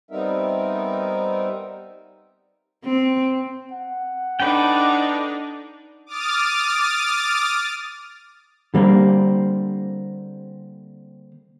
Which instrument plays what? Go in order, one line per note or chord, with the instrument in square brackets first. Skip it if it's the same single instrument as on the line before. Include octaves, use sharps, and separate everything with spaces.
[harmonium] G3 B3 C4 D#4 A#4 E5
[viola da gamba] C4
[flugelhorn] F#5
[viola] D4 D#4 [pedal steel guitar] A4 B4 G5
[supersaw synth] D6 D#6 F6 A6
[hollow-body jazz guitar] D3 G3 A#3 C4